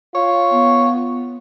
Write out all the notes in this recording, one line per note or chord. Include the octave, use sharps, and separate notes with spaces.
F4 C#5
B3